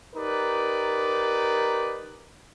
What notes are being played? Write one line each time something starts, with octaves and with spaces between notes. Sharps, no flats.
D#4 G4 A#4 B4 D5